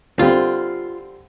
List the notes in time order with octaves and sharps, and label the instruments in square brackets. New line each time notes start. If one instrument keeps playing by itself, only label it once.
[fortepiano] D3 G3 C4 [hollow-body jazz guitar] F4